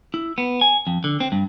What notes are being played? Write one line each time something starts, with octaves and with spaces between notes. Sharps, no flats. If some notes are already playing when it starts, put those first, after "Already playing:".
E4
B3
G#5
F2
D3
C4
G2